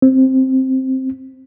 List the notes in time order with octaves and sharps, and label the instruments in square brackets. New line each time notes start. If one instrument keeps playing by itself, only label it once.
[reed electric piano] C4